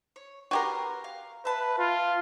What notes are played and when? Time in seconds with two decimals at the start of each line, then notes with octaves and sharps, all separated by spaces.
0.16 C#5
0.51 F#4 G4 A#4 B4 F#5 C6
1.04 F5
1.45 B4 E5 A5
1.79 F4